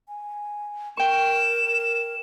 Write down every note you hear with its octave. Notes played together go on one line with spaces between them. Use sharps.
G#5
A#4 G5 C#6 E7